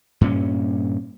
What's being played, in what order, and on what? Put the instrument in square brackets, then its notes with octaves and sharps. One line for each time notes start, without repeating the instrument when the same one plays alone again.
[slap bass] G2 A#2 C#4